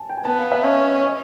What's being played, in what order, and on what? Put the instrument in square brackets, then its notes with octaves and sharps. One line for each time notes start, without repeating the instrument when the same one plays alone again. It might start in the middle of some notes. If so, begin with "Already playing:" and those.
Already playing: [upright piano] G#5 A5
G5
G#5
[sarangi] B3 [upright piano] A5
[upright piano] F5
E5
[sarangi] C#4 [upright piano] D#5
[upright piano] D#5